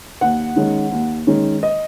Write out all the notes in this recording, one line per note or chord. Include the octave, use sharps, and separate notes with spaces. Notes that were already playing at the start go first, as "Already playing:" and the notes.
D#2 F#5
D#3 G#3 C#4
D#2
D#3 G#3 C#4
D#5